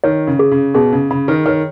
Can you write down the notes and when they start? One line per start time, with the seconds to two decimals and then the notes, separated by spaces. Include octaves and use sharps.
0.04 D#3 C#5
0.27 C#3
0.39 G#4
0.51 C#3
0.74 B2 G#4
0.93 C#3
1.10 C#3 B5
1.28 D#3
1.46 D#3 C#5